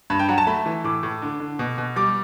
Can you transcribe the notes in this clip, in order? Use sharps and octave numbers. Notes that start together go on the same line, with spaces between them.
G2 B5
G5
F#3 F#5
A5
A3 B5
E3
A2 D6
A2
D3
D3
B2
B2
G3 D6